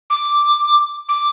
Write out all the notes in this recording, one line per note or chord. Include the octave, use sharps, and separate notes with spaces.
D6
D6